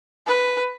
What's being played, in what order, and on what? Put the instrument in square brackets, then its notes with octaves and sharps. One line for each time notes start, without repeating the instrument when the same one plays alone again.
[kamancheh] B4